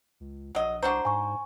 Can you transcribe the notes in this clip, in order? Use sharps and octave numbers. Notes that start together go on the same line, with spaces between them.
C#2
A#1 F#3 D#5
C2 D4 F#4 C5 A#5
G#2 G#5 C#6